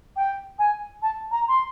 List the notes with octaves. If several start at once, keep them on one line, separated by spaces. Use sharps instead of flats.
G5
G#5
A5
A#5
C6